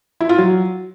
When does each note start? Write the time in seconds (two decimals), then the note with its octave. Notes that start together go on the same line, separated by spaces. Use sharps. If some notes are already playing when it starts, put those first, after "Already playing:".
0.21 E4
0.29 F4
0.38 F#3